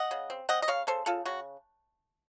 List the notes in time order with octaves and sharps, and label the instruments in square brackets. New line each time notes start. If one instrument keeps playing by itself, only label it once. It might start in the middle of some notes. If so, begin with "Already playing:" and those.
Already playing: [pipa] D#5 F#5
C#3
C4
C4 D#5 F#5
D#5
C#3 C#5 F5
C#3 A4 C5
C#3 F4 A4
C#3 F#4